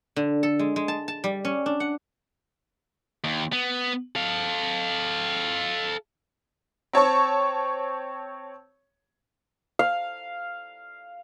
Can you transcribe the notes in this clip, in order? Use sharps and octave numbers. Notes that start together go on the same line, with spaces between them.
D3
A4
G#3
G#3
A5
A5
G3
C#4
D4
F#5
D#2
B3
A4 F5
C4 C#5 A5 C#6
F5